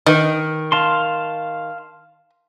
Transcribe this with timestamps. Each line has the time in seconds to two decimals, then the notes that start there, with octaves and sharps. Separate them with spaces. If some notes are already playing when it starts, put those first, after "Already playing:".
0.06 D#3 B4 D#5
0.72 F5 A5 C6